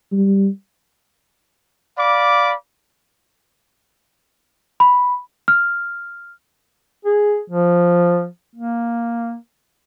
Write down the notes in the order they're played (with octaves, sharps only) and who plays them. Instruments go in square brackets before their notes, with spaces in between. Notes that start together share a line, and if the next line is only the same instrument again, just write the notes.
[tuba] G3
[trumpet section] D5 F5 B5 D6
[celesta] B5
F6
[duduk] G#4
F3
A#3